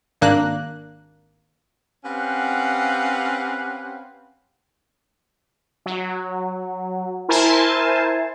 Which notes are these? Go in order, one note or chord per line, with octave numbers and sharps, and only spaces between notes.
G#1 A#3 D4 F#6
C4 C#4 G4 B4 F5 F#5
F#3
E4 A#4 C5 G#5 A5 C6